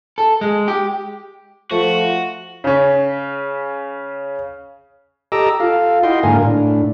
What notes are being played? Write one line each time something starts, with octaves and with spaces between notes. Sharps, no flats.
A4
G#3
G4
F3 A3 F#4
C#3 C#4
G4 A4 D#5 A#5 D6 E6
F4 A4 F5
E4 F#4 D#5 G5 C6
G#2 D3 A#3 A#4 F5 G#5
A2 D4